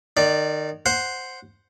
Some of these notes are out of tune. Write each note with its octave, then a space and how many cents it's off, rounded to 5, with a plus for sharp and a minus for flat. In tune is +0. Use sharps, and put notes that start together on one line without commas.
D#3 -25 D5 +0
C5 +0 F#5 -5